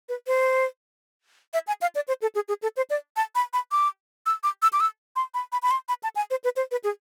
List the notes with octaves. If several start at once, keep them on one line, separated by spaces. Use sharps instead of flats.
B4
C5
E5
G#5
F5
D5
C5
A4
G#4
G#4
A4
C5
D5
A5
B5
B5
D6
E6
D6
E6
D6
E6
C6
B5
B5
B5
C6
B5
A5
G#5
C5
B4
C5
B4
G#4